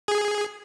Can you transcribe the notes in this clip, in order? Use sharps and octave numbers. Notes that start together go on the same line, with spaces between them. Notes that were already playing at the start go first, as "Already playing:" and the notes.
G#4